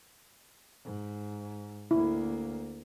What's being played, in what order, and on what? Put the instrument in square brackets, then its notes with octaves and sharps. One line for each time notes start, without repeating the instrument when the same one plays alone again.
[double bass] G#2
[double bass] D2 A#3 [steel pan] E4